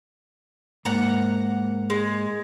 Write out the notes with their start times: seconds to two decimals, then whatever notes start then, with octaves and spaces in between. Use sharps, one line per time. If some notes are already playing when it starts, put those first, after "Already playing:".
0.85 G#2 A#3 F#5 A#5
1.90 G#3